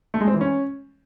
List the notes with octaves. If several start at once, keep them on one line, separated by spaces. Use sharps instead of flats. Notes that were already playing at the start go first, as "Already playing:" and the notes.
A3
G#3
C4
E3
C#4